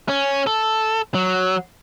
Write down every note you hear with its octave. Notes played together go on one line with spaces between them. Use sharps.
C#4
A4
F#3